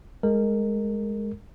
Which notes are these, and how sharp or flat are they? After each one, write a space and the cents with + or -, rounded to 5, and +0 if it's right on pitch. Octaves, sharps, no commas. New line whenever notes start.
G#3 +0 A#4 -20